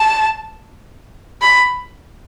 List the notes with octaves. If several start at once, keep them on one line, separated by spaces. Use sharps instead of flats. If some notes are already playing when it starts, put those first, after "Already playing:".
Already playing: A5
B5